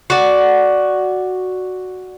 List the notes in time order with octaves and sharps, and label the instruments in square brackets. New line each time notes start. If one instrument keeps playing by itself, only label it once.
[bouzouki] F#4 D5